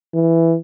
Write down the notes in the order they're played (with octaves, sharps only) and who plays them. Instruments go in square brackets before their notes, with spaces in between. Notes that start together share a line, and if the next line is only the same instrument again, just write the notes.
[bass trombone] E3